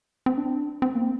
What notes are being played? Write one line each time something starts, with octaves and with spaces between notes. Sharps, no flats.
C4
D4
C4
A#3